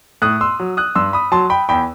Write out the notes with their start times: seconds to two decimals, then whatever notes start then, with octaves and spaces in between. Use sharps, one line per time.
0.22 A2 D#6 F#6
0.41 C6 E6
0.60 F#3
0.77 D#6 F#6
0.95 G2 C6 E6
1.13 B5 D#6
1.32 F#3 A5 C6
1.50 G5 B5
1.69 E2 G5 B5